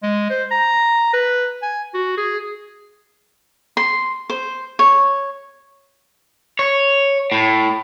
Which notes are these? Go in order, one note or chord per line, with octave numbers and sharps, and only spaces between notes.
G#3
C5
A#5
B4
G#5
F#4
G#4
C6
C5
C#5
C#5
A2